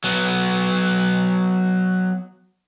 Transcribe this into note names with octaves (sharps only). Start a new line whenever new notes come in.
F#3 B3